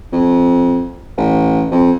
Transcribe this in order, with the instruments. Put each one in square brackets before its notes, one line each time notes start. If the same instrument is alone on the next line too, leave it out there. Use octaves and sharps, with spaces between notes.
[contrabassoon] F2
A1
F2